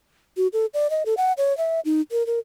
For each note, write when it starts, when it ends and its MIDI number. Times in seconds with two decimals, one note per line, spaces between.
0.37 0.48 66
0.53 0.66 69
0.74 0.90 74
0.90 1.03 75
1.06 1.14 69
1.17 1.33 78
1.38 1.56 73
1.57 1.80 76
1.85 2.01 63
2.12 2.26 70
2.27 2.39 70